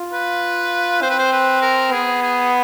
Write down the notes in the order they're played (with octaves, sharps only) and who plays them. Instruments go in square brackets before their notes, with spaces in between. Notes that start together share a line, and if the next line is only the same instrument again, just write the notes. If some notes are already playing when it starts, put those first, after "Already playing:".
Already playing: [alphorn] F4
[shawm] B4
[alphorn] C4 [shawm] C5
[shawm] B4
C5
B4
A#4
[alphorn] B3 [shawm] G#4
[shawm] G#4